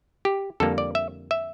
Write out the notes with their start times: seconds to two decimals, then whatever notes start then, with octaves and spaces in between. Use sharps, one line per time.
0.25 G4
0.60 F2 D3 G3 A#3 A4
0.78 D5
0.95 E5
1.31 E5